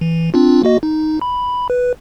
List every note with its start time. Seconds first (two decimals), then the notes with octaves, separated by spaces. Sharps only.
0.01 E3
0.34 C4 D4 F4
0.63 A#3 F#4 D#5
0.83 D#4
1.21 B5
1.70 B4